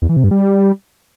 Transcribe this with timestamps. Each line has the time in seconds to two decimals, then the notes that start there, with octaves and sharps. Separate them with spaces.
0.02 E2
0.09 E3
0.16 C3
0.24 G2
0.31 G3